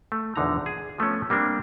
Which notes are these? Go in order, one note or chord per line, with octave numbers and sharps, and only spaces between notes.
A3
A#1 E2 D3 D#4 A#5
G#4
F3 A3 B3 C#4
G3 A#3 C4 D4